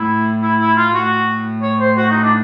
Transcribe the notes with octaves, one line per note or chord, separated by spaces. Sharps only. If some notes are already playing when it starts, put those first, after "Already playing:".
Already playing: A2 E4
E4
E4
F4
A2 F#4
C#5
C5
F#4
D#4
D4